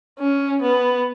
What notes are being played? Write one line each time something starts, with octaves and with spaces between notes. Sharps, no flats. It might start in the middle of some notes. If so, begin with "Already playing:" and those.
C#4
B3